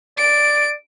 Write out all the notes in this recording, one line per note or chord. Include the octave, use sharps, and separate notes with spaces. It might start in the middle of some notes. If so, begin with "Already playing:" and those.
D5 D7